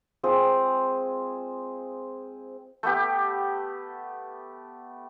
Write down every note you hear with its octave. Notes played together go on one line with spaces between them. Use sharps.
G#3 C4 F4 G#4
A3 B3 G4